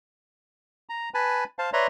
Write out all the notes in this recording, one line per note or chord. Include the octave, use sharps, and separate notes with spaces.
A#5
B4 G#5 A5 B5
C5 F5 A5
B4 C#5 D5 E5 A#5 C6